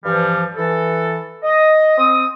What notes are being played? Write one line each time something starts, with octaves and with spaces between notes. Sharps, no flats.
G2 E3 F3 G3
E3 A4
D#5
C4 D#6